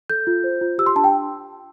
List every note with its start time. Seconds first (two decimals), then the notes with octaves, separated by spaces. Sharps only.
0.10 A4 G6
0.27 F4
0.44 C5
0.61 F4
0.78 G4 E6
0.86 C6
0.96 D4 A5
1.04 G5